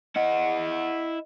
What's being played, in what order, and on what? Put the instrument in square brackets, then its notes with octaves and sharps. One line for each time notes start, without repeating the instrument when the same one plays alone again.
[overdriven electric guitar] E4 F#5 [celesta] D#5